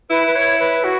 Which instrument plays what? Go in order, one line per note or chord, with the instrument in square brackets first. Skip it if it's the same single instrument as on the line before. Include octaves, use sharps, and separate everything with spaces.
[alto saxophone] E4 [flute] B4
[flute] B4
C#5
B4
F#4